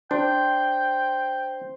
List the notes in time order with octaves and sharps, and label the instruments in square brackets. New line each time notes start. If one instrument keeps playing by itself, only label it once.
[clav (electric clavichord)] D4 [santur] C5 [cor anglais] G5